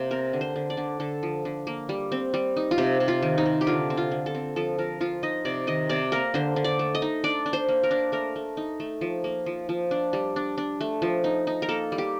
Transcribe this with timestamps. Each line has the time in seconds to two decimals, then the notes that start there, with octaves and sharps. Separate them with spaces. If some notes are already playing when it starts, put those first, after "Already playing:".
Already playing: C3 A#3 C5
0.11 C4 A#4
0.33 D3
0.41 C5
0.56 D3
0.70 D5
0.77 D3
1.00 D3 A4
1.23 F3
1.45 D3
1.67 A#3
1.89 G3
2.12 C4
2.34 G3
2.57 D#4
2.71 F4
2.78 C3 G4
3.00 C3
3.08 F4
3.22 D#3
3.38 D#4
3.46 C3
3.61 G4
3.67 D3 F4
3.90 C4
3.97 F4
4.11 D3
4.26 A4
4.35 C4
4.56 F3 A4
4.78 F3 A#4
5.01 F3 F4
5.23 D#4 D#5
5.45 C3 D5
5.67 D#3 D#5
5.89 C3 D5
6.12 A#3 A#4
6.34 D3 C5
6.56 D3
6.64 D5
6.79 A3
6.95 D#5
7.02 D#4
7.24 D4 D5
7.46 D4
7.53 C5
7.69 A#3
7.83 A#4
7.91 D4
8.12 A3 A#4
8.36 A3
8.57 D#4
8.80 A3
9.01 F3
9.24 A#3
9.46 F3
9.69 F3
9.91 D4
10.13 G3
10.36 D4
10.58 D4
10.81 A3
11.02 F3
11.24 D#4
11.47 D#4
11.62 A#4
11.69 A#3 A4
11.92 G3
11.98 G4